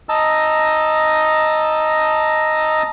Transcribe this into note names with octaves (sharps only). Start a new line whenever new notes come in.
D#5 A5 A#5 E6